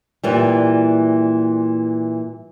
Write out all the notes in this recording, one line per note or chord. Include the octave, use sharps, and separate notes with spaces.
A#2 E3 G3